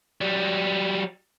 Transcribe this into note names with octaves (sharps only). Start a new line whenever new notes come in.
F#3 G3